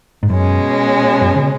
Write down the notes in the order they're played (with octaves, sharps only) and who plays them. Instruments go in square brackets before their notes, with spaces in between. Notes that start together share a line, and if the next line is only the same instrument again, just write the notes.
[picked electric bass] G#2
[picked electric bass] F#2 [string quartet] B2 G#3 C#4
[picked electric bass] F#2
C#3